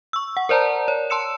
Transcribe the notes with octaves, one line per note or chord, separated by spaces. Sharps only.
C#6 E6
F#5
A#4 C5 D5 A5 A#5
C#5
A5 C6 E6 C#7 E7